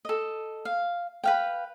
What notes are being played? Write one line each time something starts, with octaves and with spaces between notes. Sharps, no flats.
A4 D#5
F5
B4 F5 G5